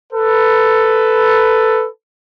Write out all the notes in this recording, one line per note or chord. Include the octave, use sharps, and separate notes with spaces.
A4 B4